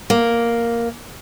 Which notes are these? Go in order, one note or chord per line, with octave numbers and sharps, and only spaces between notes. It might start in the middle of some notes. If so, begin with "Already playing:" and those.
A#3